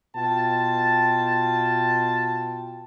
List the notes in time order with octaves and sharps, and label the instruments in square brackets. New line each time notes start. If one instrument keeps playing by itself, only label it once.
[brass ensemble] B2 F4 G5 A5